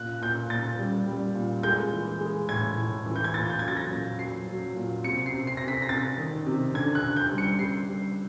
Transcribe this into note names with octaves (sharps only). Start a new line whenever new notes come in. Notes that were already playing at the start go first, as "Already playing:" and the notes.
Already playing: A#2 F#6
A#2 G6
A#2 A6
G3
G3
A#2
G#3 G6
E3
G#3
A2 G#6
A2
E3
G6
G#6
A#2 A6
G6
F#3 G#6
A6
A#6
A#2
F#3 C7
F#3
A#2
C3 C#7
C7
C3
C7
C3 A#6
B6
A#6
C3 A6
D#3
C3
D3 G#6
F#6
D3
G6
G3
C#7
G3 C7
G3